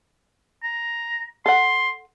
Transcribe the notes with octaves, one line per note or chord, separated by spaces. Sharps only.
A#5
A4 F#5 C6